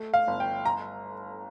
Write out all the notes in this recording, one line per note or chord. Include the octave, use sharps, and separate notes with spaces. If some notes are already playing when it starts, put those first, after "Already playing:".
Already playing: A3
F5
G1
G5
A#5